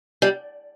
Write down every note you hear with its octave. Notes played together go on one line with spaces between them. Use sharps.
G3